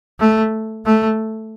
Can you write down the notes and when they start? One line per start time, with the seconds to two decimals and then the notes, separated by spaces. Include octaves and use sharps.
0.20 A3
0.86 A3